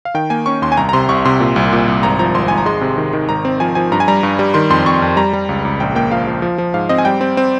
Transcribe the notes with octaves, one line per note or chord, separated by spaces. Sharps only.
F5
D#3 G5
A#3 G#5
C#4 C#6
D#2 C6
G#5
C2 A#5
A#5
C3 C6
C2 C#6
C3 C6
A#2
C2
A#2
C2
G#1 A#5
F3 A#5
G#1 C6
G#1 G#5
A#5
G#3 C6
C3
D#3
D#3
G#1 A#5
C4
F3 G#5
F3 G#5
G2 A#5
G#5
G3 A#5
G2
G3
D#3 C6
F2 C6
F2 C#6
F2
G3 A#5
G3
C#2
C#2
A#1 G5
A#3 G5
F3 F5
F3
F3
F3
G#2 F5
C4 D#5
G#5
G3 G5
C4
C4